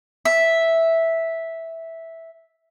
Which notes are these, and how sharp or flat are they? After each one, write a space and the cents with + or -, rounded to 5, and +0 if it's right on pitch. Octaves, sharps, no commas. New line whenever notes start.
E5 -5